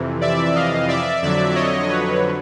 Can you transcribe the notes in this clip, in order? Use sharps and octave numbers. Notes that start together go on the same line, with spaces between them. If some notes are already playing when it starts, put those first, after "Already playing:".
Already playing: F2 C3 E3
D5 E5
D#5 F5
D5 E5
F2 D3 F#3 D5 E5
C#5 D#5
B4 C#5